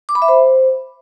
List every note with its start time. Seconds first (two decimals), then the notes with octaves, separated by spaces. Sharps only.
0.09 D6
0.15 B5
0.22 E5
0.28 C5